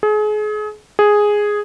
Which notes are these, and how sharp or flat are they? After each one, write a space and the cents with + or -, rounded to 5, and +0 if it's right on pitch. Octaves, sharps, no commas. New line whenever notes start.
G#4 +35
G#4 +0